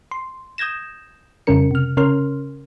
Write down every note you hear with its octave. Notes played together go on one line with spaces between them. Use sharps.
C6
D#6 G6 G#6 A#6 E7
F2 C#3 G3 C#4 A#4 C#7
C3 F6
C#3 C#4 A#4 C#5 C6 F6